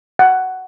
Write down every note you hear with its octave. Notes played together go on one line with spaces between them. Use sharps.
F#5